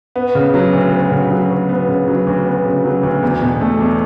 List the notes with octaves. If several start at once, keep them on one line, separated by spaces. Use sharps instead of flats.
B3
C#3
F#3
D2
B3
C#3
F#3
D2
B3
C#3
F#3
D2
B3
C#3
F#3
D2
E2
B2
A3
E2